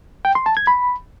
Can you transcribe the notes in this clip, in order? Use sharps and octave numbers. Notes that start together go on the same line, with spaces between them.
G5
C6
A5
G#6
B5